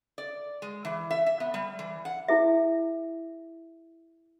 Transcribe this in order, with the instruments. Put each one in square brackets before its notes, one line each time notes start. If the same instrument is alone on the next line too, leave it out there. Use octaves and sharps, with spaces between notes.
[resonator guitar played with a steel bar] D5
G#3
E3
E5
E5
B3
G3
E3
F#5
[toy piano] E4 G#4 E5